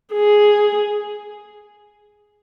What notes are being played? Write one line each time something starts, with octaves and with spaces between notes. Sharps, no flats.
G#4